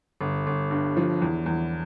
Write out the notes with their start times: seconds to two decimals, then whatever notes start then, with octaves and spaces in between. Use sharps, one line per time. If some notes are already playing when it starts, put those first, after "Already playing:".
0.21 G1
0.47 G1
0.71 G2
0.97 F3
1.22 E2
1.46 E2